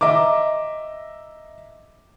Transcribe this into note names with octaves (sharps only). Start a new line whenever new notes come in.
D#5 E5 A#5 D6